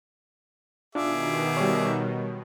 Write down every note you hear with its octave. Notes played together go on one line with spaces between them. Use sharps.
B2 D#3 D4 F4 G#4 E5 D6
G3 C#5